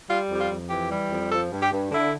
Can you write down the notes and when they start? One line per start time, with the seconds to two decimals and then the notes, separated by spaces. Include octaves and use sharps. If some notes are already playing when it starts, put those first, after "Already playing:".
0.08 G3 F4
0.28 F2
0.34 G4
0.39 F4
0.49 F2
0.69 E3 G4
0.90 G3
1.10 F2
1.31 F3 A4
1.51 G2
1.61 G4
1.72 G2
1.91 D3 E4